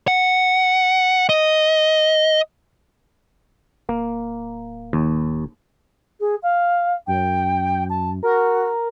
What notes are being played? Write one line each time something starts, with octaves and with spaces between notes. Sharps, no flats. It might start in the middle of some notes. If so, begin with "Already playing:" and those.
F#5
D#5
D1 A#3
D#2
G#4
F5
F#2 G5
A5
F#4 A#4